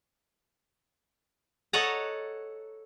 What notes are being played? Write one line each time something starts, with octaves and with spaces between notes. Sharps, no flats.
A4 C#5 D#5 F#5 A5 A#5